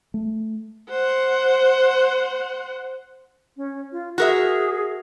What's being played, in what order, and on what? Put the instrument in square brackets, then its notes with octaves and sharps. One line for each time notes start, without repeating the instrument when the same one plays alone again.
[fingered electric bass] A3
[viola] C5 F#5
[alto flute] C#4
F4
[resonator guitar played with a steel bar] F#4 A#4 E5 [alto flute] G#4